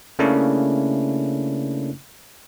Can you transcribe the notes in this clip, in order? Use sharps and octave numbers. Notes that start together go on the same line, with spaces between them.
C#3 A3 A#3 C#4 D4 E4